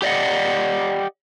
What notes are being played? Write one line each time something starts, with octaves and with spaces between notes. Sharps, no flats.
G4 D5 D#5 F#5